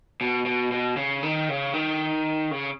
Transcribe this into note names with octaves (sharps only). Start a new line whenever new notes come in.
B2
B2
B2
C#3
D#3
C#3
D#3
C#3